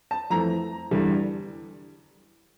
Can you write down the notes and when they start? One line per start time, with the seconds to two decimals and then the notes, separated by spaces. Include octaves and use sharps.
0.11 A5
0.30 F2 E3 A3 A#5
0.91 E2 D3 G3